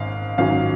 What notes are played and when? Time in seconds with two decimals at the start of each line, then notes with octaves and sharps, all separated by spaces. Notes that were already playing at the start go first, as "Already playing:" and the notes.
Already playing: G#1 G#2 C#4 F5
0.38 G#1 G#2 F#3 C#4 F4 F5